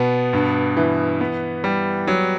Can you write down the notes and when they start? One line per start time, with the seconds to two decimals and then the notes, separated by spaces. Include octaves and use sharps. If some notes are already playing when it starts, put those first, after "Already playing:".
Already playing: B2 B3
0.33 G2
0.77 E3
1.21 B3
1.64 G3
2.08 F#3